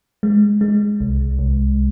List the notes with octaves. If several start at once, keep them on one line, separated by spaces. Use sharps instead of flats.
G#3
G#3
C2
C2